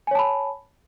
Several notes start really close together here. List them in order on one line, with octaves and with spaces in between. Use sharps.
G#5 C#5 A5 B5